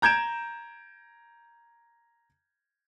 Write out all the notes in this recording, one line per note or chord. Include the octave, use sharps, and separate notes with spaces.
A#5 G6 G#6 D7 E7